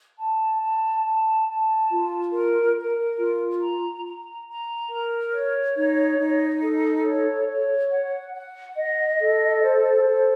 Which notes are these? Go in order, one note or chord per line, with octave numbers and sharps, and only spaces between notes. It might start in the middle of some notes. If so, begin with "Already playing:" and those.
A5
A5
A5
A5
F4
A#4
A#4
F4
A#5
A#5
A#5
A#4
C#5
D#4
D#4
A4
C#5
C#5
F#5
F#5
D#5
A4
C5
A4